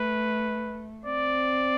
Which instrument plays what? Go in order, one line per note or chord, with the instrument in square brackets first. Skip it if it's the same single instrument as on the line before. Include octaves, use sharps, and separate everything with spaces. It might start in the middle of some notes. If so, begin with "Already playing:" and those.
Already playing: [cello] A3 [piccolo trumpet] B4
[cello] C4 [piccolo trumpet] D5